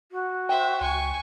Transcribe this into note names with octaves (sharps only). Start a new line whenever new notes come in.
F#4
C5 E5 G5
C#2 G#5 C#6